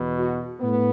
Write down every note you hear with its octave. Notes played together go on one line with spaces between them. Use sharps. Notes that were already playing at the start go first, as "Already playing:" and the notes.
Already playing: E2 B2
F#4
A2 B3